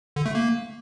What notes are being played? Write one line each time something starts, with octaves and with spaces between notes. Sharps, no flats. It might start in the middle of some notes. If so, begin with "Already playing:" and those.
D3
A3
A#3